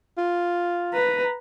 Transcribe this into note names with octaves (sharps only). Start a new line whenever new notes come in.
F4
B4 A#5